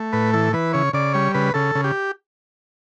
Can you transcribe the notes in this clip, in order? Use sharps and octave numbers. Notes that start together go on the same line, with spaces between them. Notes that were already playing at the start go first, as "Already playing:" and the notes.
Already playing: A3
A2 B4
E3 A4
E3 B4
C#3 C#5
C#3 D5
G3 C#5
C#3 B4
C#3 A4
C#3
G4